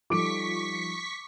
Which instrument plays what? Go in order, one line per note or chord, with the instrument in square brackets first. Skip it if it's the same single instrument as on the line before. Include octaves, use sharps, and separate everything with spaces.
[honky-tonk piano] F3 D7 [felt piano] G3 D#4 A4 [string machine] C#6 B6 [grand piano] D6